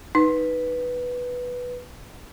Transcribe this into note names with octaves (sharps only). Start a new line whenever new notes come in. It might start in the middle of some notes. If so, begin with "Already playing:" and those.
D#4 B4